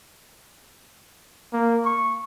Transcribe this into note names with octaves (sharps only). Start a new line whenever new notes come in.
A#3
C#6